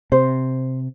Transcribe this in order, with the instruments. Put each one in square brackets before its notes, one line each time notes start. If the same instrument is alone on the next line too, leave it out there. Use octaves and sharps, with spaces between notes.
[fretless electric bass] C3 [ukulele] C5